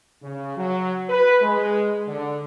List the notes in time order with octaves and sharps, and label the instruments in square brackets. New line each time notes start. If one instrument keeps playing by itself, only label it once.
[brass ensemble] C#3
F#3
B4
G#3
D3